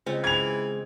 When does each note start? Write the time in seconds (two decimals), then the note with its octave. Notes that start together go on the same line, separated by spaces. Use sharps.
0.06 C#3 G#3 C4 F4
0.24 E3 G#6 F7